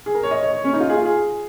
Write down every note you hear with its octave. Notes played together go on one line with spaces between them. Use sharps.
G#4
A#4
C#5
D#5
C#5
C#5
C#4
D#4
F4
G#4
F4
G#4